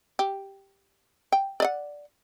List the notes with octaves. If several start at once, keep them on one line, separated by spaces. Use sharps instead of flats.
G4
G5
D5 D#5 F#5